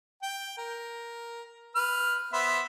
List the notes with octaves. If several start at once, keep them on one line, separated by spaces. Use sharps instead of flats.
G5
A#4
B4 F6
B3 C5 E5